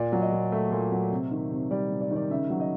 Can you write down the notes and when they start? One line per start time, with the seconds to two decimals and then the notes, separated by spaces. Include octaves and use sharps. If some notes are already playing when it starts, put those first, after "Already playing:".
Already playing: A#2 D5
0.12 F#3
0.22 D#5
0.32 A#2
0.52 A3 E5
0.72 A#2
0.91 F#3
1.12 C3
1.31 D#3
1.51 C3
1.71 G3 D5
1.91 C3
2.01 D5
2.11 D#3 D5
2.30 C#3 E5
2.50 F#3
2.60 D#5